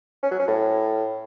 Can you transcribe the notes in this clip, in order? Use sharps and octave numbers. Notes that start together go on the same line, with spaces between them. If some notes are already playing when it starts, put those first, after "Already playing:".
C#4
F#3
C#4
A2